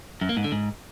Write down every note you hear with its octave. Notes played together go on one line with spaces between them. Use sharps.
F#2
A#3
G#2
D3
G#2